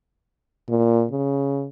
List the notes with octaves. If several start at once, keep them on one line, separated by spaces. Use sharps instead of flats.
A#2
C#3